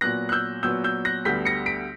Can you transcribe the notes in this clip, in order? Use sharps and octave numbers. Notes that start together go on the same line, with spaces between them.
A#2 F#3 B3 F#6 A#6
F#6
E6 G6
A#2 F#3 B3 E6 G6
E6 G6
F#6 A#6
D2 D3 G3 B3 G6 B6
A#6 C#7
B6 D7